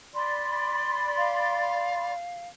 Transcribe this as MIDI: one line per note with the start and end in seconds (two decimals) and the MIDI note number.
0.14 2.11 74
0.14 2.11 83
0.14 2.11 84
1.17 2.47 77